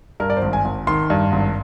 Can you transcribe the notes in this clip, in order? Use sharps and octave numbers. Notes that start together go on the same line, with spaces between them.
G2 A#4
D5
C5
G#1
G#5
G#1
D#3 C6
G2
G#1